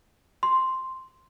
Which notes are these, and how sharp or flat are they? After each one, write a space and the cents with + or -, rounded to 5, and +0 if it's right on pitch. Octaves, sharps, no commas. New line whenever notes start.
C6 +0